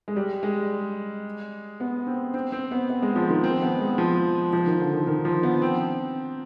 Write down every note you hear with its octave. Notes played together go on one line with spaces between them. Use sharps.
G#3
G3
G#3
B3
C4
C4
C4
B3
B3
G#3
F3
D#3
C4
B3
G#3
F3
F3
D#3
D3
D#3
D#3
F3
B3
C4